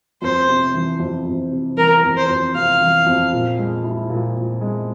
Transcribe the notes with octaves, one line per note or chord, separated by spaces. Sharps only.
F2 C5
C3
E3
F2
F2
C3
E3 A#4
F2
C5
F2
C3 F5
E3
F2
A#2
G#3
E4
A#2
A#2
G#3